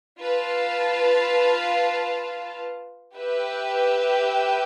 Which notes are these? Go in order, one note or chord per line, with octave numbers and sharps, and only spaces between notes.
F4 B4 F5 A5
G4 B4 E5 G5